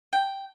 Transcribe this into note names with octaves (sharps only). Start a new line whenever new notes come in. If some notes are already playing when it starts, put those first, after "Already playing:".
G5